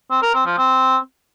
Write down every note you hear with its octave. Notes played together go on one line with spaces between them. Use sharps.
C4
A#4
C4
F3
C4